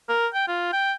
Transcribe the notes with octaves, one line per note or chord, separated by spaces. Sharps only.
A#4
G5
F4
G5